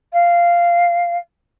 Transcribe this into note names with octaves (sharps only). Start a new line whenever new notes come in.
F5